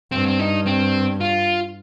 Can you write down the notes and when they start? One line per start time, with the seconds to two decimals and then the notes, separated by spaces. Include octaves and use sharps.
0.12 G2 C4
0.27 C4
0.40 D#4
0.66 C4
1.21 F4